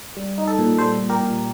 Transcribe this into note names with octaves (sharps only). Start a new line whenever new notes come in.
G3
D#4
A4
A#2
G3 A4 C5
A#2
G4 A#4
A#2